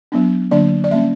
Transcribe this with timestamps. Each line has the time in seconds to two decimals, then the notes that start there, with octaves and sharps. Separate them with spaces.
0.12 F#3 B3 D4
0.51 D3 F#3 A#3 D4 D5
0.84 D5
0.91 G3 A#3 C#4 E5